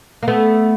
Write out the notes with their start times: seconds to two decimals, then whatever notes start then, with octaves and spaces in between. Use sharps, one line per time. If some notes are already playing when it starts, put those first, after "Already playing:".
0.23 A#3
0.28 A3 B3